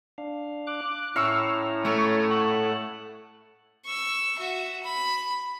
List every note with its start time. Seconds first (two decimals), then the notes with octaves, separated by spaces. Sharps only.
0.18 D4 F5
0.67 D6 F#6
1.16 A2 C#4 E4 F5 A#5 C#6 E6
1.85 A3 C#5 C#6
2.31 F#5 A5 F#6
3.86 C#6 E6
4.39 F#4 E5
4.83 B5